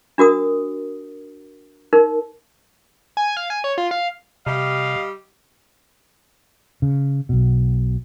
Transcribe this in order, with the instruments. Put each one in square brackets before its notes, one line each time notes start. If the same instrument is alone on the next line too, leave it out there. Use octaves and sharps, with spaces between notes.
[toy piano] D4 F#4 A#4 D#6
D#4 A#4
[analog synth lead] G#5
F5
G#5
C#5
F4
F5
[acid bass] C3 [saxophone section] G3 G4 D#5 [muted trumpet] F5
[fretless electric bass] C#3
B1 B2